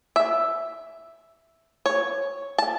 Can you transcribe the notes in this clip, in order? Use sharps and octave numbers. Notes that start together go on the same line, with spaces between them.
E5
C#5
A5